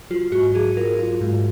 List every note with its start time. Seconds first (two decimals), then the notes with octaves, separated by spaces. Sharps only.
0.10 F#3 F4
0.32 G#2 F#4
0.54 F#3 G#4
0.77 F4 A#4
0.99 F4
1.21 G#2